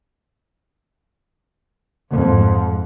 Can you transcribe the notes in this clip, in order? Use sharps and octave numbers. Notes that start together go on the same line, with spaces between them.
F2 G#2